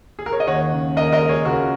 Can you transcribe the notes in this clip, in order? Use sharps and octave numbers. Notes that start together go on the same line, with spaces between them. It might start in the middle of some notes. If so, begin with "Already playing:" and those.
G#4
A#4
C#5
D#5
D#2 C#5 F#5
C#3
D#2 A#4 D#5
A#4 D#5
G#3
G#4 C#5
C#2 F#4 A#4